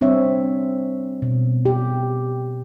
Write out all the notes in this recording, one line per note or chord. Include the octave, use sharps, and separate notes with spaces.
G3 C4 D4 C#5 E5
B2
G4